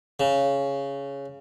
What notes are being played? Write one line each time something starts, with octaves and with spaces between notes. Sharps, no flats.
C#3